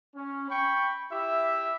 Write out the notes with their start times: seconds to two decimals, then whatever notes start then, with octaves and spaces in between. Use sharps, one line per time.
0.16 C#4
0.49 G5 B5 C#6
1.11 E4 G4 E5